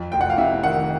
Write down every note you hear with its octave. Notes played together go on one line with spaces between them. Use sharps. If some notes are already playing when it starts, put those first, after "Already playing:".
Already playing: F2
F1 G5
F#5
F5
C3 E5
D#3 F#5